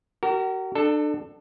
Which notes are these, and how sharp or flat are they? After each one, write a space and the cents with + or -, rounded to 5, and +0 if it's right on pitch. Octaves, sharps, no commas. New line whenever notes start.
F#4 +40 A#4 -20
D4 +30 A4 +0